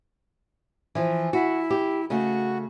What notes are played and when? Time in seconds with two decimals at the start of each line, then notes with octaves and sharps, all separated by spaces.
0.95 E3 F3
1.33 E4 F#4
1.71 G4
2.10 C#3 A3 F#4